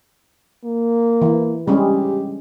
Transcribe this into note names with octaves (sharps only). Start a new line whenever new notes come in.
A#3
E3
G3 G#3 C#4 G4